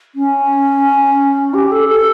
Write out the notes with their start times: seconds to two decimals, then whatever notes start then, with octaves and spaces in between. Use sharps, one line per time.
0.15 C#4
1.53 G4
1.71 A4
1.88 A4